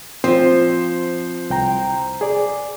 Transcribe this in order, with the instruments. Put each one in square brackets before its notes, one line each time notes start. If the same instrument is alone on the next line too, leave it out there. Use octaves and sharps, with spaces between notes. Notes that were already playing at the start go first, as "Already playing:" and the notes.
[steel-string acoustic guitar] F3 [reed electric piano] C4 [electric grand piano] C5
[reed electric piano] C2 G5 A#5
G#4 D5